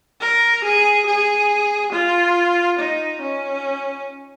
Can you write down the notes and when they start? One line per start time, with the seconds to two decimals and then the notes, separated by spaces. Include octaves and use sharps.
0.21 A#4
0.64 G#4
1.07 G#4
1.93 F4
2.79 D#4
3.22 C#4